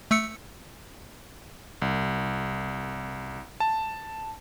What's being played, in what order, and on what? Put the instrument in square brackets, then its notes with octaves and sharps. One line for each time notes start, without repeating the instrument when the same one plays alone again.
[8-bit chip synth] A3 E6 C#7
[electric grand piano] C2
A5